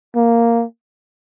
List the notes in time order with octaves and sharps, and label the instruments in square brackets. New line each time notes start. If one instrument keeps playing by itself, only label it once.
[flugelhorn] A#3